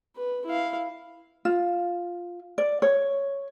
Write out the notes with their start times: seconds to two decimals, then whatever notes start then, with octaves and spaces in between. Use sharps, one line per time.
0.16 B4
0.46 E4 F5
1.45 F4
2.58 D5
2.82 C#5